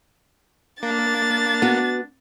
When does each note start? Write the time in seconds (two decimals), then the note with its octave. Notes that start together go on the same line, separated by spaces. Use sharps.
0.83 A#3 D4 A6
1.62 B3 F#4